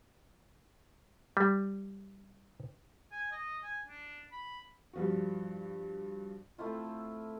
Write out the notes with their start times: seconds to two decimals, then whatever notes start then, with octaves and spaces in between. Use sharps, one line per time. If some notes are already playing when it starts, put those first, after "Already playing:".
1.37 G3
3.12 G#5
3.32 D#5
3.63 G#5
3.87 D4
4.32 B5
4.93 G2 F3 F#4
6.58 A3 C4 E4 F4